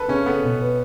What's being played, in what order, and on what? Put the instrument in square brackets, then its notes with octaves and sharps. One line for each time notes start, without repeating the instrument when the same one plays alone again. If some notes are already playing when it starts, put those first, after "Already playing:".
Already playing: [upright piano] A4 B4
[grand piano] C#3 [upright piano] C#4
[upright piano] B3 [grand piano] A4
[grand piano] B2
B4